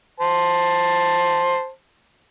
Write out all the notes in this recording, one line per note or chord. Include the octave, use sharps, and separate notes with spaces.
C5 A5